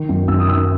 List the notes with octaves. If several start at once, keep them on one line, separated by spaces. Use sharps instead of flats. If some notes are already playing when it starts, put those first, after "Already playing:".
Already playing: D#3
F#2
F#2 E6
D#6
D#3 E6